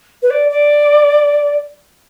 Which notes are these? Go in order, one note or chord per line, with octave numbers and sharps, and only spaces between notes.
B4
D5
D5